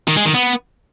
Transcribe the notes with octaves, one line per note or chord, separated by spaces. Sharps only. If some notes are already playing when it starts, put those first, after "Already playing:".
D#3
G#3
D#3
B3